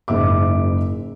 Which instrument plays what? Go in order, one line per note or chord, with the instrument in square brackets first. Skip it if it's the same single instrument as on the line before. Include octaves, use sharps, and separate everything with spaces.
[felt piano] F#1 G#2 E5 D6